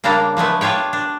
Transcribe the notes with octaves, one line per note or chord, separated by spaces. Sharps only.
C#3 G3 A#3 D4 A4 A#5
F3 G#3 A3 B3
D4 F4 G4 C#5 G5
D4